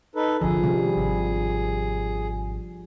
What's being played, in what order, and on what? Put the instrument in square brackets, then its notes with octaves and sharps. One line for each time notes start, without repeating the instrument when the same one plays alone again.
[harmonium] D#4 A4 B4
[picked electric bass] G1 C2 D3 [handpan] F3 [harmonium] G#4
[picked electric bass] C3 D#3 C#4 [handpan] G3
[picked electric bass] G#1 C3